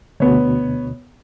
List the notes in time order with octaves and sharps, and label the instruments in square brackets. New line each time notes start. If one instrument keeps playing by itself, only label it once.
[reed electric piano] D2 B2 [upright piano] B3 C#5